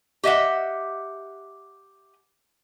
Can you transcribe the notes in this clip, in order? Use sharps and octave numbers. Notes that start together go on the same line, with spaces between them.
G4 D#5 E5 F#5